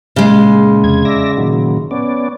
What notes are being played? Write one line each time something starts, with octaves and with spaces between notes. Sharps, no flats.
A#2 C#3 G#3
E2 C3 G#6
D5 E5 A#6
A#2 D#3 F#3
B3 C#4 D5